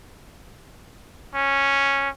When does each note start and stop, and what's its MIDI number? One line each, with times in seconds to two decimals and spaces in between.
1.34 2.10 61